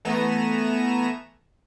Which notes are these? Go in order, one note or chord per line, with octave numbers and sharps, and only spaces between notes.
E3 A3 B3 G#5 A#5 E7